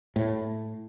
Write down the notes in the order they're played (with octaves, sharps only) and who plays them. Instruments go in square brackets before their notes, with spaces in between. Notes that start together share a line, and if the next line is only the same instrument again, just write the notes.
[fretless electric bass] A2